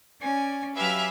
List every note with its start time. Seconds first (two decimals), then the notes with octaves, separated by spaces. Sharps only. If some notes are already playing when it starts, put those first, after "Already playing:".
0.22 C#4 D5 G#5
0.76 F#3 G4 B4 E5 F5 G#5 F6